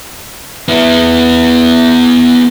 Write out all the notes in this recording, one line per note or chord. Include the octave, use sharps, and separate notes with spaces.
B3 E4